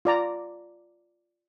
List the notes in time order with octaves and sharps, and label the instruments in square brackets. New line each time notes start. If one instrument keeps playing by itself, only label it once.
[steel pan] F4 D5 A#5